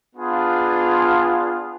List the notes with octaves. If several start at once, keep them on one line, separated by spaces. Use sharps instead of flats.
B3 D4 F4 G#4